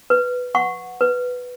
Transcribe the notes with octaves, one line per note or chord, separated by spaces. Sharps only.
B4
F#5 C#6
B4